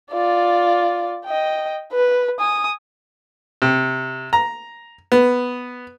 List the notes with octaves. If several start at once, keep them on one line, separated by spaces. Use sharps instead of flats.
F4 D5
D#5 G5
B4
G#5 D#6
C3
A#5
B3